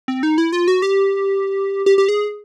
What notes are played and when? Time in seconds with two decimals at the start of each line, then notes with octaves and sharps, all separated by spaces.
0.08 C4
0.23 D#4
0.38 E4
0.53 F4
0.68 F#4
0.82 G4
1.86 G4
1.98 G4
2.09 G#4